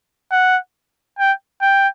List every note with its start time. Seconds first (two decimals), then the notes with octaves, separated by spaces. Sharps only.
0.31 F#5
1.19 G5
1.62 G5